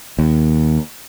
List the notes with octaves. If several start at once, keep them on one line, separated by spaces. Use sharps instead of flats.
D#2